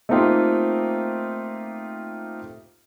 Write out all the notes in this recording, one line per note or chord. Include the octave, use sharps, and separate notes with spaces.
A3 A#3 C4 D#4 F4 G4